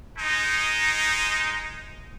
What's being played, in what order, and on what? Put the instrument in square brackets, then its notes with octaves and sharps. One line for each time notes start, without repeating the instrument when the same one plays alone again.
[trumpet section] G#3 D#4